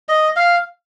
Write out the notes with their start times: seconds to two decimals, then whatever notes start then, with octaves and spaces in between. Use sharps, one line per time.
0.09 D#5
0.36 F5